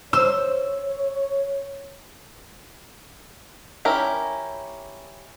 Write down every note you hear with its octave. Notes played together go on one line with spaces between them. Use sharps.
C5 C#5 E6
C#4 E4 G4 A#4